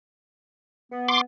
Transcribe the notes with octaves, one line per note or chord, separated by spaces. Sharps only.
B3
C6 D6